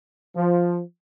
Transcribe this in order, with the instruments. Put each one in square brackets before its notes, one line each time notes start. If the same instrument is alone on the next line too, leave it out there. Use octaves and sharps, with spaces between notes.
[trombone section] F3